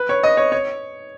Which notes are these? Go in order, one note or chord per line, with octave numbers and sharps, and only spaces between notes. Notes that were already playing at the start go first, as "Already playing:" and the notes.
Already playing: B4
C#5
D#5
C#5
C#5